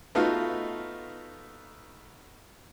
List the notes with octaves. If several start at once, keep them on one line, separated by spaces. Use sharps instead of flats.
A3 B3 D#4 F4 F#4 F5